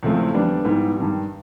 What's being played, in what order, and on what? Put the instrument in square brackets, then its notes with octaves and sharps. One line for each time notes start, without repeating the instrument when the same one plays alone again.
[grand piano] E2 C#3 F3 A3 C4
F2 D3 G3 B3 D4
G#2 E3 G3 B3
G2 D#3 G3